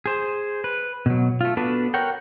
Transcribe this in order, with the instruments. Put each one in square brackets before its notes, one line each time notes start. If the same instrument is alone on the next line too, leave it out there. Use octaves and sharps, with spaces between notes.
[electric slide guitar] G#4 C5
B4
B2 F#3
A3 F4
B3 D4 F#4 A4 B4
A#4 C#5 F#5 G5